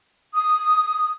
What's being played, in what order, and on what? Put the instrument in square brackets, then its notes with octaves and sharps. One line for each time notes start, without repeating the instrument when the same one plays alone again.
[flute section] D#6